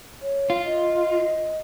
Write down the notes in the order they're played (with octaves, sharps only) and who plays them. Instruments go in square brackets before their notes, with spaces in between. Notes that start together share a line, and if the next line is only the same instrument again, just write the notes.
[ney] C#5
[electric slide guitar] F4
[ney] D#5